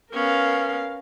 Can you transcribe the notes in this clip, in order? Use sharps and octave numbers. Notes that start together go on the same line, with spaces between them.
B3 C#4 A#4 F5